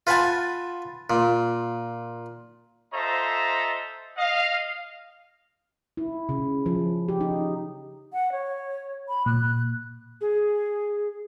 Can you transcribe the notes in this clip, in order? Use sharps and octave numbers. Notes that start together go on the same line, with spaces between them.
F4 B4 F#5 G#5 A5
A#2
F4 A4 C5 D#5 E5 A#5
D#5 F5
E4
C#3
F3
G4
D#4
F#5
C#5
B5
A#2 F#6
G#4